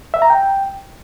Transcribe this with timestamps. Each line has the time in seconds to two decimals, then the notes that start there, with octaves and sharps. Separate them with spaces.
0.14 E5
0.22 A#5
0.30 G5